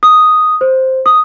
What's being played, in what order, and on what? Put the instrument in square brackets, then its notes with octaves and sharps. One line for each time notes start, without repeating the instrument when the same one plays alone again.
[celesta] D#6
C5
D#6